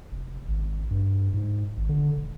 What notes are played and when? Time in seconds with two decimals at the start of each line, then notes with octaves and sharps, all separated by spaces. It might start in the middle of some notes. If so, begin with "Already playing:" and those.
0.12 F1
0.48 G#1
0.91 G2
1.34 G#2
1.77 G#1
1.89 D3
2.17 E1